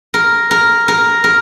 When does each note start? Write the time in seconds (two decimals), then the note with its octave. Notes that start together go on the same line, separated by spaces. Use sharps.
0.14 A#4
0.51 A#4
0.88 A#4
1.24 A#4